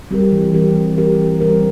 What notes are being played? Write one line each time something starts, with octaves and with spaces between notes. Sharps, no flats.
G3 C4 G4 A#4
E3
G3 C4 G4 A#4
E3
G3 C4 G4 A#4
E3
G3 C4 G4 A#4